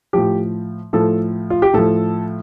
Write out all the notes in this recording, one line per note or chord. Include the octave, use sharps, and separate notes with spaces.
A2 F3 G4
A2 F3 A4
F4
G4
A2 F3 A4